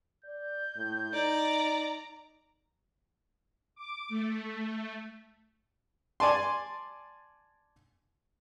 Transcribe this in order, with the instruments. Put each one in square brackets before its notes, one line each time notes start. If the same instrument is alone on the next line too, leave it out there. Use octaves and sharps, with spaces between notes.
[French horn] D5 [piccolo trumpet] G6
[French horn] A2
[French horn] D#4 [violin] D5 [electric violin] A#5
[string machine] D6
A3
[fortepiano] D5 G#5 A5 C6